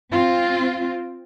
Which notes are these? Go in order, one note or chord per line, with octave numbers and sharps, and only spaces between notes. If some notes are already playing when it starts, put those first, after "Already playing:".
C4 F4